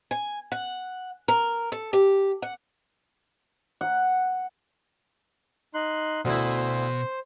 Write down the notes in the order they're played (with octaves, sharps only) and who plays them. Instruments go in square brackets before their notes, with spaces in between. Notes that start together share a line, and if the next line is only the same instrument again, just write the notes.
[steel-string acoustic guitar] G#5
F#5
A#4
A4
G4
F#5
[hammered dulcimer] F#5
[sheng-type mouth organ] D#4 C6 F#6
[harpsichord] D2 E4 [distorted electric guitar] B2 [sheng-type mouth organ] C5